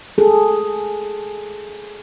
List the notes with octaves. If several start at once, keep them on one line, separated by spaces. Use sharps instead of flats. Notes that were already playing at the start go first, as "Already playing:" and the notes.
G#4 A4